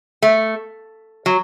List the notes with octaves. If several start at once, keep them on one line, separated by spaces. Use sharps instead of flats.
A3
F#3